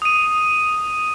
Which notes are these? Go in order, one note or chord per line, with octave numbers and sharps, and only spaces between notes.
D#6 D#7